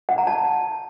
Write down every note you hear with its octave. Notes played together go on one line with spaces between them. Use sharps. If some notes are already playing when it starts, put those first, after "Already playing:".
F#5
A#5
A5